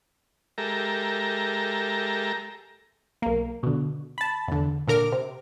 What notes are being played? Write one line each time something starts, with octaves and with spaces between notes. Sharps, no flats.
G#3 G4 A4 A#4 E5 A#5
B1 A#3
B2 D3
A5 B5
E2 D3
A#2 D3 A#4 D6 F6
C3